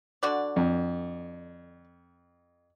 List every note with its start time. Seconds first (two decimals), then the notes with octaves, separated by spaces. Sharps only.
0.23 D3 F#4 D5
0.56 F2